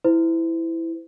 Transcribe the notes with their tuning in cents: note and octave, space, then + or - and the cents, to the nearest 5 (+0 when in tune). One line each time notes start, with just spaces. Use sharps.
E4 +0 C5 -40